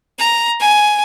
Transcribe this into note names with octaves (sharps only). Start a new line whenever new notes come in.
A#5
G#5